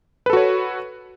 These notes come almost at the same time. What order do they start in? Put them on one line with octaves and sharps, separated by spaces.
B4 A4 F#4 C#5